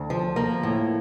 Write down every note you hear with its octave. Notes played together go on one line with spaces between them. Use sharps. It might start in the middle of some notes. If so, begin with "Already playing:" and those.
Already playing: D2
F3
A#3
A2